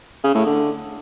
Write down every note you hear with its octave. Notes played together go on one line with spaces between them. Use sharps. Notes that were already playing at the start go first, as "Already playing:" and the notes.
C#3
A2
D3